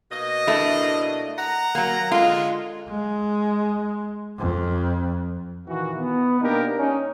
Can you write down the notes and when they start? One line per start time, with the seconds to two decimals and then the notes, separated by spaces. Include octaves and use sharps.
0.12 B2 A#3 D#5
0.47 A3 D4 E4
1.39 F#5 A#5
1.75 F#3 A#3
2.11 D3 G#3 F4
2.88 G#3
4.38 F2
5.67 A#2 D#3 E3 A#3 F#4
5.99 B3
6.40 B2 A#3 D4 D#4 G4 A#4
6.76 C#4 D#4